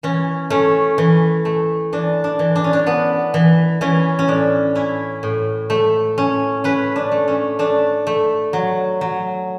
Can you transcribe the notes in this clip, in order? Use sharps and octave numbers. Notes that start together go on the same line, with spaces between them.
E3 C#4
A3 C#4
E3
A3
E3 D4
D4
E3
D4
C#4
D4
B3
E3
E3 C#4
C#4
A2 D4
C#4 E4
A2
A3
C#4
C#4 B4
D4
A3
C#4
A3 D4
A3
F#3
F#3